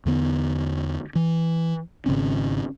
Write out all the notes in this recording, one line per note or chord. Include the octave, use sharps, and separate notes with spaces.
E2 D3 B3
E3
G#1 C#3 C4 C#4